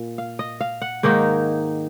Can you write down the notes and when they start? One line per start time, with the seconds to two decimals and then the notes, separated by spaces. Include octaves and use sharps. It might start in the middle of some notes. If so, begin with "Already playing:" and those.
Already playing: A#2
0.18 F5
0.39 D#5
0.61 F5
0.82 F#5
1.03 G#2 D#3 A#3 D#4